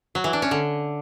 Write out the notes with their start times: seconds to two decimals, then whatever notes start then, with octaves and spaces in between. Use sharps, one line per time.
0.15 F#3
0.24 E3
0.33 D4
0.42 C#4
0.51 D3